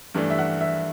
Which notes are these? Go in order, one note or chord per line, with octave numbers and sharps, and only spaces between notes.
G2 E3 A3 D4
E5
F#5
E5